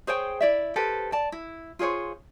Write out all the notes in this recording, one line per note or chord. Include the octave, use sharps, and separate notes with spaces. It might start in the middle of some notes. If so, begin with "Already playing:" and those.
G#4 C5 C#5 G5
E4 D5 E5
G4 A4 B4 C5
D5 A5
E4
F4 G#4 C5 C#5